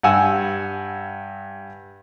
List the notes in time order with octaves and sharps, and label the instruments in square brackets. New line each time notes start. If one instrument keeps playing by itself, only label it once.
[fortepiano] G2 F#5 G#5 E6